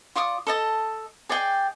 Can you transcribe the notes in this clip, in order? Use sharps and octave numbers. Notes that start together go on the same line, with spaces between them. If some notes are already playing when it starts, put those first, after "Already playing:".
F4 D5 C#6 D#6
A4 D#5 A5
G#4 D5 D#5 G5